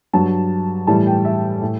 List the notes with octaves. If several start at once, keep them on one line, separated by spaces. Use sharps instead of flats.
G2 F#3 A5
A2 E3 G3 A5
G5
E5
A2